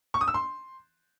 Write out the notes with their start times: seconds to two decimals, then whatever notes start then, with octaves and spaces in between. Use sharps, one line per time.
0.14 C#6
0.21 D#6
0.28 E6
0.34 C6